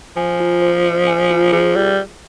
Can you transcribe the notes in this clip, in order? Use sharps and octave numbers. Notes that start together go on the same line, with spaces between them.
F3 G#5
F4
C5
D#5
G#5
F4
F3 G#4
G3